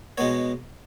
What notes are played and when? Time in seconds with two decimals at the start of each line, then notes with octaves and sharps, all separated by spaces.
0.18 B2 G#3 B3 C#5